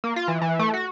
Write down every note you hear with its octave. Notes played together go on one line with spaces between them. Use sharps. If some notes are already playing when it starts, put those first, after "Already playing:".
A#3
F4
E3
E3
A3
F#4